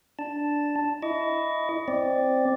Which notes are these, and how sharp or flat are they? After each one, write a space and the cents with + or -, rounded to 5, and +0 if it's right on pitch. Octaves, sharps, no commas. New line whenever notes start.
D4 -5 A5 +0
E4 +0 D#5 +0 C#6 +45
C4 +0 D5 +0